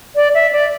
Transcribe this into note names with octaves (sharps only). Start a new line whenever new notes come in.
D5
E5
D5